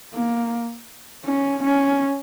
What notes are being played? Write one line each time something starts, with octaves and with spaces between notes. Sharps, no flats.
A#3
C#4
C#4